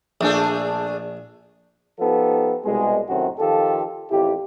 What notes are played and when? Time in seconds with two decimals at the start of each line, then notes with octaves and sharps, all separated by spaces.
0.21 A#1 A3 D4 G#4
2.00 F3 B3 D#4 G4 A4
2.64 C2 B2 G#3
3.08 F#2 A2 C3 D#3 C4 F#4
3.39 D#3 F3 F4 G4 A4
4.11 A1 F2 E4 G4